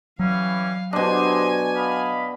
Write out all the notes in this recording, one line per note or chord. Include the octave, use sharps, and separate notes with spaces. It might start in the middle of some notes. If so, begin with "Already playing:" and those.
E3 F#3 G3 C#4 F5
B2 D4 G4 C5 D#5 G#5
D#5 F5 B5